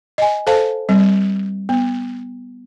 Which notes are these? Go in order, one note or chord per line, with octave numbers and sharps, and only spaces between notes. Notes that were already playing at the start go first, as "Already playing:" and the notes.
D#5 G#5
A4 C5 F5 A5
G3 C4
B3